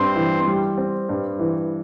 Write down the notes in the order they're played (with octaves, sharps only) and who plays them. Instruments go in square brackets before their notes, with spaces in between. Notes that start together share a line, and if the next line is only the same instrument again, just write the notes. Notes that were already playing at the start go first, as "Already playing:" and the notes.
Already playing: [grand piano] G2 [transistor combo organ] C4
[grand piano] E3
G3
C4
G2
E3